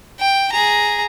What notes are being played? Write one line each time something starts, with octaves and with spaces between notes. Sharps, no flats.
G5
G#4 A#5